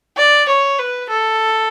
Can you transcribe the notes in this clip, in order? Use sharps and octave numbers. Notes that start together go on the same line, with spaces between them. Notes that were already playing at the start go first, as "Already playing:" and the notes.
D5
C#5
B4
A4